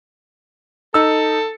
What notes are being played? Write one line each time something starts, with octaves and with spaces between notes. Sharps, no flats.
D#4 A4 E6